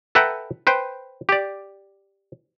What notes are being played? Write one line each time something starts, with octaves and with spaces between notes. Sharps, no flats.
A4 B4 E5 F#5 G5 A#5
B4 C5 G5
G4 D5